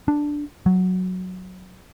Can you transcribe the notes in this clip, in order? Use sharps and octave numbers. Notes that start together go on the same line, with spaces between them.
D4
F#3